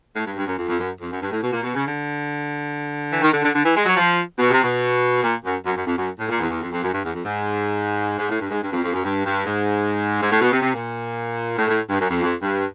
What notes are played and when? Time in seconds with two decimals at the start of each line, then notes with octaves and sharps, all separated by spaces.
0.16 A2
0.26 G2
0.37 G2
0.47 F#2
0.58 F2
0.68 F2
0.79 F#2
1.01 F2
1.11 F#2
1.21 G2
1.31 A2
1.42 B2
1.53 A#2
1.64 B2
1.74 C#3
1.85 D3
3.12 E3
3.22 D#3
3.32 D3
3.43 D3
3.54 D3
3.65 E3
3.75 G#3
3.86 F#3
3.97 F3
4.39 B2
4.51 C3
4.63 B2
5.23 A#2
5.44 F#2
5.66 F#2
5.76 F#2
5.86 F2
5.97 F#2
6.19 A2
6.29 A#2
6.40 E2
6.50 E2
6.61 F2
6.71 F2
6.82 F#2
6.93 G2
7.03 E2
7.14 F2
7.24 G#2
8.19 G#2
8.29 A2
8.41 G2
8.51 G#2
8.62 G2
8.72 F2
8.83 F2
8.93 F#2
9.04 G2
9.25 G2
9.46 G#2
10.21 G#2
10.31 A2
10.41 B2
10.52 C3
10.62 C3
10.73 A#2
11.57 A2
11.68 A2
11.90 G2
12.00 F#2
12.10 F2
12.22 F2
12.42 G2